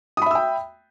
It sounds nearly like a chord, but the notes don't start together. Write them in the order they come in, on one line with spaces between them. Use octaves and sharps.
D#6 B5 E5 E6 G5